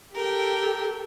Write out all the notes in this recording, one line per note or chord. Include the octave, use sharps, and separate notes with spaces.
G4 A4 A#4 G5